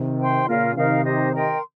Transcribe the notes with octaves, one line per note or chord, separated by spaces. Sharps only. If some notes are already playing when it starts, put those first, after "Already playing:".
Already playing: C3 D#3
C5 G5 C6
A#2 C#3 F4 A#4 F5
C3 D#3 D#4 A#4 F5
D#4 G4 C5 D#5
A#4 D#5 G5 C6